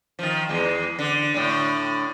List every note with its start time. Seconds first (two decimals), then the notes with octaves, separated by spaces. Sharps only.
0.19 D#3 F3
0.49 E2 G#3
0.99 D3
1.34 A2 D3